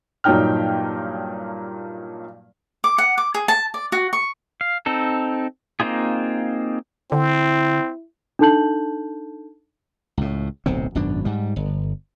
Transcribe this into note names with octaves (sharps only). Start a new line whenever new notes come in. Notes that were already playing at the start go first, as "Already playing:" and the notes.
G2 A#2 F#3 D#4 G5 F6
D6
F#5
D6
G#4
A5
D5
F#4
C#6
F5
C4 D#4 A4
A#3 C4 D#4 F4 G#4
D3 C4 E4
D4 D#4 A4 A5 G6 F#7
C#2 A2
D1 B1 C3 C4
G#1 F#2 B2 D4
G#2 G3
G1